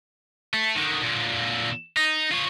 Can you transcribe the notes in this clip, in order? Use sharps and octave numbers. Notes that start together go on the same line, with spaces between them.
A3
D3 D#3
A#2 D3
D#4
F4 C#5